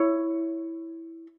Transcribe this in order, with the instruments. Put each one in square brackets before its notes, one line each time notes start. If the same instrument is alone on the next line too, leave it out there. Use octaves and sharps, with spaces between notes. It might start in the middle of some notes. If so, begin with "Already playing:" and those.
Already playing: [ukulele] E4 C#5